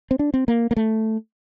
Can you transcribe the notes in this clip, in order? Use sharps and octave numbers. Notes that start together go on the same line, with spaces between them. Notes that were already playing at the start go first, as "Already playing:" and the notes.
C4
D4
C4
A#3
A#3
A3